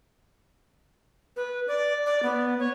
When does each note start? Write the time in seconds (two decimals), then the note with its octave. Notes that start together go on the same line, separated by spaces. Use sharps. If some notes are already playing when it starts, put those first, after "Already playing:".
1.36 B4
1.68 D5
2.06 D5
2.23 B3
2.59 C#5